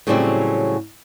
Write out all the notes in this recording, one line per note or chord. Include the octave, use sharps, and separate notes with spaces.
A2 C#3 F#3 G3 C4 E4